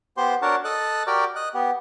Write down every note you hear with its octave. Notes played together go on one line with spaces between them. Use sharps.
B3 G4 C5 C6
D4 F#4 A#4 C#5 F#5 A5
A4 D#5 A5 F#6
F#4 G4 A#4 D5 G5
D#5 F#6
B3 G4